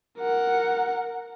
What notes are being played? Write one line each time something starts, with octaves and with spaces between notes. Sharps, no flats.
A#4 F#5